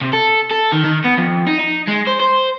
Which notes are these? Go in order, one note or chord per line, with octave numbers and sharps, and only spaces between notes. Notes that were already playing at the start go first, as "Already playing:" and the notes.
C3
A4
A4
D#3
D#3
B3
F2
D#4
D#4
G#3
C5
C5